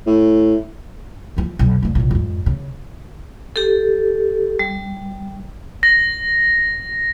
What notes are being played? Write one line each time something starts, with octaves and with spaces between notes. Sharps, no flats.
A2
D#3 F3
B1 F2
F1 D3
A#1 C3
F2 G#2
C#3
G4 A4
G3
A#6